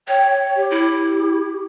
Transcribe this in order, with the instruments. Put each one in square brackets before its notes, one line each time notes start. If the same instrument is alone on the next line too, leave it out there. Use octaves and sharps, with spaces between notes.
[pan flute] C#5 [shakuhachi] G5
[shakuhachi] G4
[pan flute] E4